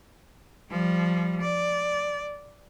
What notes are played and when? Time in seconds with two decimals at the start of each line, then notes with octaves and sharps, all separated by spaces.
0.70 F3 G3
1.41 D5